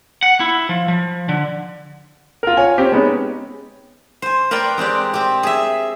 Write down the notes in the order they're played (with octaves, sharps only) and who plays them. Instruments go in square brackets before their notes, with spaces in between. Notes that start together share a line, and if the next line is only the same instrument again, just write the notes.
[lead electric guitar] F#5
E4
F3
F3
D3
[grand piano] F4 A#4
F4 C#5 G#5
C4 C#4 G4
G#3 B3 C#4 D#4
[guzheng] C5 G#5
A#4 B4 D5 G5 A#5 C6
G#3 C4 G4 D5
C4 G4
G#4 E5